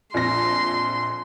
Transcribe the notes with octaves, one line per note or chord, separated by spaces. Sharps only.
A#1 F2 C6 A#6